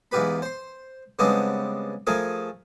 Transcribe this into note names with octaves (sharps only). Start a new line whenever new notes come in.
E2 G#2 F4 G4 B4 B5
C5 C6
C#3 G3 G#3 B3 C4 D4
F3 A3 G#4 A#4 G#5